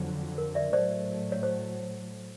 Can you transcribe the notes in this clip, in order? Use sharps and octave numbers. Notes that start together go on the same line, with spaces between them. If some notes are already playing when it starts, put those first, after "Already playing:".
Already playing: F2 D3 F#3
A#4
D5 E5
A2 F#3 A3 C5 D5
C#5
C5